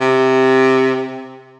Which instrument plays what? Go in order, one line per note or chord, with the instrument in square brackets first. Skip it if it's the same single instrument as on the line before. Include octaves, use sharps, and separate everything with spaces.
[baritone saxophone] C3